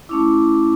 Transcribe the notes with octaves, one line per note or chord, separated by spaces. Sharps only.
A3 C#4 E4 D6